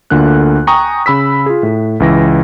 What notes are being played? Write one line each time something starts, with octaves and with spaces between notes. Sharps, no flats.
D2 D3 A#3 F4 F#6
G5 G#5 A#5 C#6 D#6
C#3 B5 E6 B6
F4 G#4
A2
C#2 E3 A#6